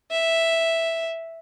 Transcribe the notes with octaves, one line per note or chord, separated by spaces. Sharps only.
E5